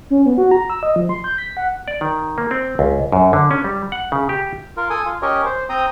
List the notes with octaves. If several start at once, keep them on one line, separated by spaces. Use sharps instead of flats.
C#4
B3
F#4
A#5
E6
D#5
F3
C6
G6
B6
F#5
D5
D#3
A#3
C4
C#2
F#2
D3
C#4
G3
F#5
C#3
G4
F4 A#4
A4 G#5 D#6
F4
C#4 G4 A#4 C#5 D#5
C5
C4 G5 A#5 D#6